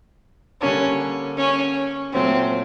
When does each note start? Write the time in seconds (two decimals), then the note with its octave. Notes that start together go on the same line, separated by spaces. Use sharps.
0.61 D3 G3 A#3 C#4 D4
1.37 C#4
2.12 A#2 F#3 A3 C4 C#4